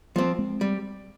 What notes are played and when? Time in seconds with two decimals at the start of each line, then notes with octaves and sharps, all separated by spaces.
0.16 F3 G3 A#3 C4
0.39 G#3 C4
0.61 G3